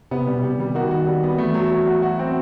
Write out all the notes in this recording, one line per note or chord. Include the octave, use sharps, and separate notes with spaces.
C3 B3
B2 G3
C3 G3
D#3 G3
D#3 F#4
F#4
G3
B3
E3 A3
F#3
F#3
F#4
F#4
C4